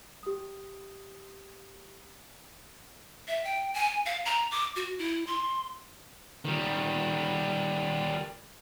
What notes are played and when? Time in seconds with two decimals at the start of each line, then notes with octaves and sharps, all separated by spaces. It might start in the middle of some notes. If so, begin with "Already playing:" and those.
0.23 G4 D#6
3.28 E5
3.44 G5
3.74 G#5
4.06 F5
4.25 A#5
4.51 D6
4.76 F#4
4.99 E4
5.27 C6
6.45 D#3 G3